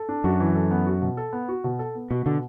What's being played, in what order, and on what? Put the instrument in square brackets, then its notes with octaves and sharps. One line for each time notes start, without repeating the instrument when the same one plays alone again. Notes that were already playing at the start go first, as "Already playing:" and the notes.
Already playing: [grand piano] A4
D4
[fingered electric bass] F#2 [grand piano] F#4
[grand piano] E3
A4
B3
F#4
B2
A4
B3
F#4
B2
A4
B3
[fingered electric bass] B2 [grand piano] F#4
[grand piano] B2 [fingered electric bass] D3